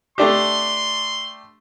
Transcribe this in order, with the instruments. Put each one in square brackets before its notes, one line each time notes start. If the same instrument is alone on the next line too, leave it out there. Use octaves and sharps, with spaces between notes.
[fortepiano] A3 D4 G4 [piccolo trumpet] C6